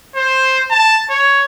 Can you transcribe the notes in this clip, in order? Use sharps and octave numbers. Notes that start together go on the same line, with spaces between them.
C5
A5
C#5